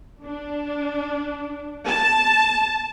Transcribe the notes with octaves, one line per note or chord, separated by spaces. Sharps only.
D4
A5